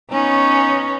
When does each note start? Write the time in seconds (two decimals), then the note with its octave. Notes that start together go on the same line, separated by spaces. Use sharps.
0.10 B3 C#4 D#4